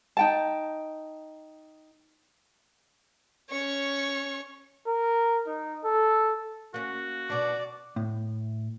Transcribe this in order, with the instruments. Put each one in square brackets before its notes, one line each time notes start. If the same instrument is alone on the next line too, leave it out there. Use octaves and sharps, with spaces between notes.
[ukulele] D#4 G5 A5
[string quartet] C#4 C#6 [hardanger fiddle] C#5
[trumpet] A#4
D#4
A4
[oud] A#3 C#4 [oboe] F#4
[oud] B2 D4 [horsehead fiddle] D5
[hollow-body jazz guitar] A2